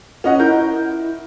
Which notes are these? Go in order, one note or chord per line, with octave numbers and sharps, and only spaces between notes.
C#4 D#5 F#5
E4 A#4 G6